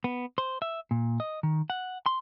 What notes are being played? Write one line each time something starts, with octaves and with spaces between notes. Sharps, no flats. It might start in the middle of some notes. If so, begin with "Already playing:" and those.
B3
C5
E5
A#2
D#5
D#3
F#5
C6